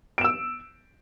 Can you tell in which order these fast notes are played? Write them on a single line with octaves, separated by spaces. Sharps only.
D7 E7 E6